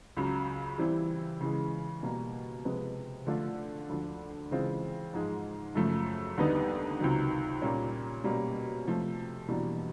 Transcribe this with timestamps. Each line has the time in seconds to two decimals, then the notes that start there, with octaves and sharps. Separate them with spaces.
0.17 C#2 C#3 F#3
0.78 E3 G3 C4 E4
1.41 C#3 E3 G#3
2.03 B2 G3 A#3
2.65 C3 F3 G#3 B3
3.27 D3 F3 A3 D4 F4
3.89 D2 D3 F3
4.51 C#3 E3 G#3 C4 F4
5.13 G#2 F3 G#3
5.75 F#2 C#3 F3 A3
6.38 D#2 D3 G3 B3 D#4
7.00 C#2 C3 D#3 F#3
7.62 A#2 G3 A#3 C#4
8.24 B2 G3 A#3 C#4
8.86 C3 F3 A3
9.48 E2 B2 G3 A#3 D4